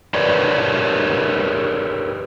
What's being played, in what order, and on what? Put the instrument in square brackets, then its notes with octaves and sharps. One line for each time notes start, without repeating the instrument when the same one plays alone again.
[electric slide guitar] G4 A#4 B4 C#5 D5